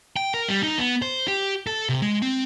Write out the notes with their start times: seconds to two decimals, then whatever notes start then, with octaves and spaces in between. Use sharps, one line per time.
0.16 G5
0.34 A#4
0.48 G3
0.63 D#4
0.78 B3
1.02 C5
1.28 G4
1.67 A4
1.89 C3
2.02 G#3
2.22 C4